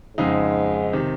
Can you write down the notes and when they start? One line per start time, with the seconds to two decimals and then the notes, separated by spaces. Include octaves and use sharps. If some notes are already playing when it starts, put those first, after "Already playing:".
0.17 F2 G#2 C#3 G#3 D#4
0.93 C3 D#3